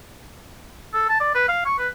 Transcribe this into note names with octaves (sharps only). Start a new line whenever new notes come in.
A4
A5
D5
B4
F5
C#6
B4